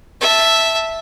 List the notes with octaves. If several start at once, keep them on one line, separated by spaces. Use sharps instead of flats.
E5 A5